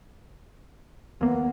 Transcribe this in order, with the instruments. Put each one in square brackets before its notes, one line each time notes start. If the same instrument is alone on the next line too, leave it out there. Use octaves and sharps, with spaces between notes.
[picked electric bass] D#2 A#3 [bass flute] B3